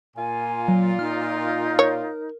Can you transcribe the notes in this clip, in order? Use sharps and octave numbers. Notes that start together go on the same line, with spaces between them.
A#2 F4 G#5
F#3
D#4 F6
A#4 C#5